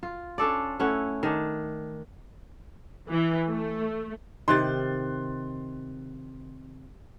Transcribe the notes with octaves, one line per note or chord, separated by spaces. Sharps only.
F4
C#4 D4 A4 D5
A3 C#4 E4 F#5
D#3 D4
E3
A3
C3 D#3 C6 F#6 A6